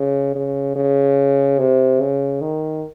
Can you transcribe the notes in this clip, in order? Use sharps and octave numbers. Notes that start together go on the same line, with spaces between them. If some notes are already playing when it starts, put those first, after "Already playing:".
Already playing: C#3
C#3
C#3
C3
C#3
D#3